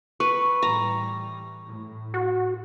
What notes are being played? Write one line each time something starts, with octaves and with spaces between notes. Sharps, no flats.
B4 C#6
A2 E3 G3 A#5
A2
F#4